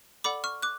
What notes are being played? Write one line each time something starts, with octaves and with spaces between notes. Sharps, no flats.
A4 D5 F#5 B5 D6
C#6 F6
D6 F#6